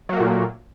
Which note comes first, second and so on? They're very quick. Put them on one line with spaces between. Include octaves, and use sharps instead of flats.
F#3 A#3 A3 A#2